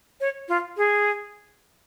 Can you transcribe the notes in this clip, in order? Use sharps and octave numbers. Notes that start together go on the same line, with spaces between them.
C#5
F4
G#4